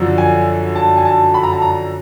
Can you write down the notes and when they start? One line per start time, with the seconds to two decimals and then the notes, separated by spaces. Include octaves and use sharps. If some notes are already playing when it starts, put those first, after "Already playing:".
Already playing: F#2 D3 F3
0.18 G#5
0.76 A5
0.98 G#5
1.05 A5
1.34 B5
1.43 A#5
1.52 A5
1.62 A#5